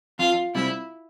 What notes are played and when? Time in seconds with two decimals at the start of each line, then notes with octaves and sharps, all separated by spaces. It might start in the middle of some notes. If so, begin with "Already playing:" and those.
0.19 F2 F4
0.55 C3 G3 C4 E4